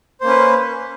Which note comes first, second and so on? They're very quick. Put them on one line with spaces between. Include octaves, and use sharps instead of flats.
C5 A#3 C#4 B4